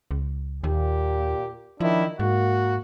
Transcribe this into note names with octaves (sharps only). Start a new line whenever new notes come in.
C#2
D#2 A#2 G4
D#3 F3 D4 E4
G#2 A#3 F#4